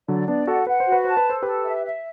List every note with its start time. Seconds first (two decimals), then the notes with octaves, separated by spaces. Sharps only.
0.08 D3 F#3 D5
0.28 B3 D4 D5
0.47 F#4 A4 F#5
0.67 B4 F#5
0.80 C5
0.87 F#4
0.92 B4
1.04 C5 A5
1.17 B4
1.26 A4 C5
1.42 G4 A4 B4
1.65 E5
1.84 E5